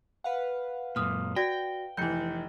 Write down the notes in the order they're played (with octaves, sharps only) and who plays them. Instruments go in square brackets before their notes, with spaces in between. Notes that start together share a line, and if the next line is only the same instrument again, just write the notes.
[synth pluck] B4 F5 F#5
[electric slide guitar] F#2 A#2 [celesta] D#6 F6
[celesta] F#4 D5 A#6 [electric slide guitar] G5
[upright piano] F1 E3 [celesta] G6 C#7